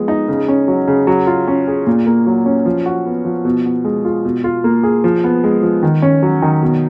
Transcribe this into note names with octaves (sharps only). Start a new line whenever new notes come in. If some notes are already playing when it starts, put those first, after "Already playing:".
Already playing: F3 G#3 B3
D#4
C#3
C#4
F#3
C#3
F#3
F4
C#4
G#4
A#2
A#3
F#3
C#4
F3
F#4
B3
F3
B2
B3
G#3
F4
B2
F4
A#3
G#4
F3
B3
G#3
F3
D#3
C#4
F#3
D#3
B2